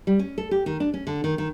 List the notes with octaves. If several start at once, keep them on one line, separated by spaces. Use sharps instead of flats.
G3
C#4
A4
G4
D#3
D4
C#4
D3
D#3
D#3